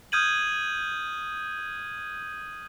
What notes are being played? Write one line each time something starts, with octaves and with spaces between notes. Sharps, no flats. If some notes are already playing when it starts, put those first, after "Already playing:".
D#6 F6 G6 G#6 D#7 F#7